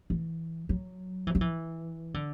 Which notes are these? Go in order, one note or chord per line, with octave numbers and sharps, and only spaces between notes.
E3
F#3
E3
F#3
E3
D3